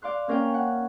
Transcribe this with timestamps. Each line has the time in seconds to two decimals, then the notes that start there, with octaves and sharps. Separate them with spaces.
0.02 D5 F5 C6 F#6
0.28 A#3 C#4 A#4 F5 G5
0.54 F#5